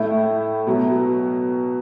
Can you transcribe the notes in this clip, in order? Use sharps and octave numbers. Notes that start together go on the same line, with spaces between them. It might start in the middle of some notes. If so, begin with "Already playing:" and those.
Already playing: A2 A3 E4
B2 F#3 B3